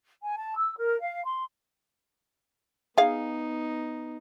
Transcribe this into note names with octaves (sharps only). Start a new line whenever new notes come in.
G#5
A5
E6
A#4
F5
C6
B3 D#4 G#4 F5